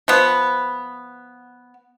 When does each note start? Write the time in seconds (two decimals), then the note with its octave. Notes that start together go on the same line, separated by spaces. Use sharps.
0.08 F3 B3